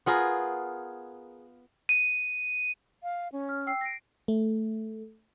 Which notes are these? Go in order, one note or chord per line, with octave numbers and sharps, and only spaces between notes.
B3 F4 G#4 A#4
D#7
F5
C#4
F6
G5 E6 C7
A#6 C7 D7
A3